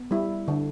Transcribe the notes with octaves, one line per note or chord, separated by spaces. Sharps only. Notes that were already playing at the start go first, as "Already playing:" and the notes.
Already playing: B3
G3 E4
D3